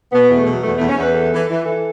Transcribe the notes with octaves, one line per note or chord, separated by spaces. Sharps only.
B2 B3
E2
A3
B2
F#3
E2 A3
E2 A3
C#4
E2 B4
E3 A4
E3
E3
E3 A4